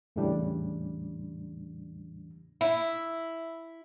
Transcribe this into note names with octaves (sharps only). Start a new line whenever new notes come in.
E2 A2 C#3 E3 G3 D4
E4